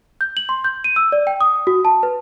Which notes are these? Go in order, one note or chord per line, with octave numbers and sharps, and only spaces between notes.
G6
F#7
C6
G6
D#7
E6
D5
G5
D#6
F#4
A5
B4